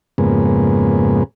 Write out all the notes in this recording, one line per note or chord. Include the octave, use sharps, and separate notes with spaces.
F2 G#2 C#3 G#3 A#3 B3